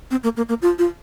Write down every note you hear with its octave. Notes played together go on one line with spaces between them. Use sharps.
C4
A#3
A#3
A#3
F4
F4